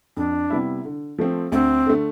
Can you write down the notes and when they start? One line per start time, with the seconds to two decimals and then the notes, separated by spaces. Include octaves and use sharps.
0.17 F2 D4
0.50 C3 G3 B3 E4
0.85 D3
1.18 F3 A3 C4
1.52 D2 C4
1.86 D3 A3